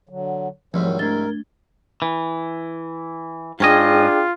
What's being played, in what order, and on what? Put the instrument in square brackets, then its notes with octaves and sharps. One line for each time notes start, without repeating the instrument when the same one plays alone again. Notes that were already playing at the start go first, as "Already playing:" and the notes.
[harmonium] D3 F#3
[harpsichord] C2 G#2 [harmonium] D#3 F#3 [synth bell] F3
[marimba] A3 D4 A6 [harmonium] A#4 [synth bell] G#6 G7
[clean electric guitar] E3
[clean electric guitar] G#2 C#4 D#5 [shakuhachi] D4 [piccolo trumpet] F4 [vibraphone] G#4 G5